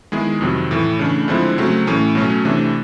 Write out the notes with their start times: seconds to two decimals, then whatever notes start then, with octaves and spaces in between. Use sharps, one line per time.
0.12 D#3 G#3 B3 E4 G#4
0.41 F2 C3 D#3 F#3
0.71 A2 E3 A3
0.99 C#3 E3 A3 D4
1.28 D3 F3 G#3 C4 E4
1.58 C#3 F#3 A3 C4
1.87 A2 E3 A3 C#4
2.15 B2 F#3 A3 C#4
2.45 C3 E3 A3 D4